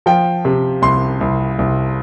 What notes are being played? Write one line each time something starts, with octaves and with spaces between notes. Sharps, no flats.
F3 G5
C3
C2 C6
C2
C2